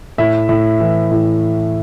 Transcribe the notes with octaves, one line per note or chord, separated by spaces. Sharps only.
A2 E5
A2
E3
A2